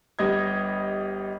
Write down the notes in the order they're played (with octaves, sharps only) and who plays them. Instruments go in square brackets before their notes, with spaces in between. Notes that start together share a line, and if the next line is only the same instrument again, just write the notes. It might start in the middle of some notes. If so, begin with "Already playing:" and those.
[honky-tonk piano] G1 G3 D#5 G#6